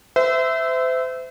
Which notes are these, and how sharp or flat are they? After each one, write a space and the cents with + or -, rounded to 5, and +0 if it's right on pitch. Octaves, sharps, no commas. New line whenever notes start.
C5 -35 E5 -5